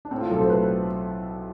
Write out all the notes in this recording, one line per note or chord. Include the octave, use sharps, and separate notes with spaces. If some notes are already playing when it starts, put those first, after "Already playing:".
D4
A2 C4
F4
B1 A4
C5
A3 B4